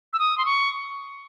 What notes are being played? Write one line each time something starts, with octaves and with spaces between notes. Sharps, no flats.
E6
D#6
C6
C#6